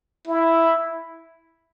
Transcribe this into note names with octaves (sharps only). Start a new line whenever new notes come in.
E4